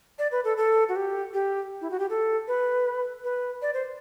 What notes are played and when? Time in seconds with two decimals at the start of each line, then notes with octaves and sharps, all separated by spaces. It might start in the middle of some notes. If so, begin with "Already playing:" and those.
0.19 D5
0.32 B4
0.44 A4
0.57 A4
0.89 F#4
0.96 G4
1.34 G4
1.81 E4
1.91 F#4
1.99 G4
2.10 A4
2.48 B4
3.24 B4
3.62 D5
3.74 C5